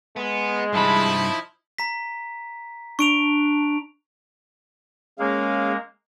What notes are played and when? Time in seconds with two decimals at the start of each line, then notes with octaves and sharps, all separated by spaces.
0.16 G#3 B3
0.73 G2 C3 F3 D#4 E4 A5 B5
1.78 A#5 B6
2.99 D4 C#6 D7 F7
5.19 G#3 A#3 C#4 G#4 F5